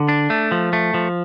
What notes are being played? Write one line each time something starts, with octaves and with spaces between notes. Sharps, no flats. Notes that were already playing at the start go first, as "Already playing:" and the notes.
Already playing: D3
D4
A3
F3
A3
F3